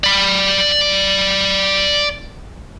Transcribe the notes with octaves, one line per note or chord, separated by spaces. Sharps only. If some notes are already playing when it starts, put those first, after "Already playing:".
D5 B5